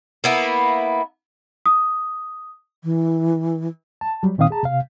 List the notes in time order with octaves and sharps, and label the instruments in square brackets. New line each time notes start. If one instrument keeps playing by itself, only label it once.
[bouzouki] A#3 B3 E4
[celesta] D#6
[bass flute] E3
[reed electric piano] A5
F#3 G3
A#2 D#3 C4 F5 D#6
G#4 A5 A#5
C3 F5